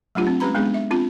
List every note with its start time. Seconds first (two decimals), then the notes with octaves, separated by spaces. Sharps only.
0.15 F#3 A3 D4 F4 G4
0.27 C4
0.40 G#3 C#4 G4 B4 A#5 B5
0.55 G#3 B3 D4 G#4
0.74 E5
0.91 C4 D4 F4